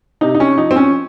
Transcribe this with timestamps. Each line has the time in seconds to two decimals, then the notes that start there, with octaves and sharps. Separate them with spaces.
0.21 C3 D#4
0.35 D#4
0.40 C#4
0.58 F3 D#4
0.71 C4
0.76 C#4